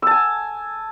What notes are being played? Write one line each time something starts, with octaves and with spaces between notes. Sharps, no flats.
G#5 A5 E6